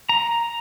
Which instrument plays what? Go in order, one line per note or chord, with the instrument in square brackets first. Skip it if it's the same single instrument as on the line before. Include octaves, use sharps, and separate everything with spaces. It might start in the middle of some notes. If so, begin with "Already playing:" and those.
[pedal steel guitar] A#5